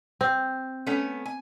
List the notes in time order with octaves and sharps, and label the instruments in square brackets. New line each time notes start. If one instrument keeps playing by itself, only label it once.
[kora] C4
[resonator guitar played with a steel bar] A3 B3 C#4
G#5